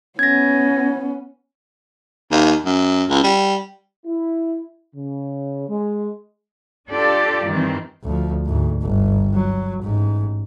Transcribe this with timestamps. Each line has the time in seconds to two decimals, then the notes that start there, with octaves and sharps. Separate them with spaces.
0.19 B3 C#4 G#6 A#6
2.31 D#2
2.65 F#2
3.09 C#2
3.24 G3
4.06 E4
4.96 C#3
5.69 G#3
6.89 D4 F4 G4 A4 D5
7.46 G2 D#3 E3 C4
8.03 D2 F3
8.45 D2 G#2
8.81 G1
9.34 F#3
9.83 A1 G#2